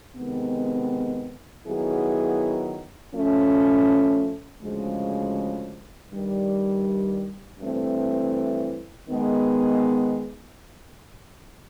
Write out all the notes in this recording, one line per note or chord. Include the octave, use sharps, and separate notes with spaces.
C3 D#3 G#3 B3
D#3 F#3 B3 E4 G#4
F3 A3 C#4
D2 C#3 F3 G#3
G2 D#3 G3
G2 E3 A3 C4
D#3 G#3 B3